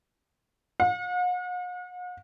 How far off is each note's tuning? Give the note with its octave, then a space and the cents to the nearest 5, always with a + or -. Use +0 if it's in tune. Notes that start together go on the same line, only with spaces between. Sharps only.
F#5 -45